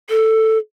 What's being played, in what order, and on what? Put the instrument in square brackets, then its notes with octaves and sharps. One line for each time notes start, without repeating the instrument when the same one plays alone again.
[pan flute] A4